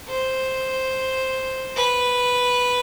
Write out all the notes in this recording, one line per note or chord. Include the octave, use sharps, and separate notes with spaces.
C5
B4